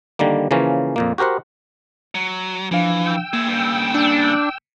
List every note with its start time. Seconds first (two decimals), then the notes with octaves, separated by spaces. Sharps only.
0.19 D3 D#3 G3 A#3
0.51 C#3 E3 F3 A#3 C#4
0.96 F2 A#2 A#3
1.18 F#4 G4 A#4 C5 F#5
2.15 F#3
2.71 E3 F3 D4 F5
3.05 G5 E6
3.33 A#3 G#4 E5
3.48 G2 C#3
3.94 D4